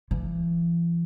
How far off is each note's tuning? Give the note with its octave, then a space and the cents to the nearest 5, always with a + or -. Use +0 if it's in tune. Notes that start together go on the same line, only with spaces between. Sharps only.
E3 +45